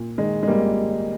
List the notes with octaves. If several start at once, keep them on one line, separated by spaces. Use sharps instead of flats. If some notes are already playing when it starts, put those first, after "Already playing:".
Already playing: A#2
D#3 G#3
G#3
G#1 G3 A#3